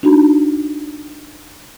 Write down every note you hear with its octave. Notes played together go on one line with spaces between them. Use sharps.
D4 D#4 F#4